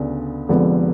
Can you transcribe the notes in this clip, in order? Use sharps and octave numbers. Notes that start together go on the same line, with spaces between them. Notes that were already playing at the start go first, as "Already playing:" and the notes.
Already playing: D2 C#3 B3 D4
F1 F2 D3 G#3 B3